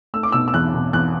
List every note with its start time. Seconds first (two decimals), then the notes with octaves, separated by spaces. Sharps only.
0.14 A3 E6
0.23 D6
0.32 B2 E6
0.48 E6
0.54 E2 F#6
0.74 B2
0.93 E2 F#6